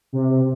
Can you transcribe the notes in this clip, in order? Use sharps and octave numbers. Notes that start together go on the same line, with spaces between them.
C3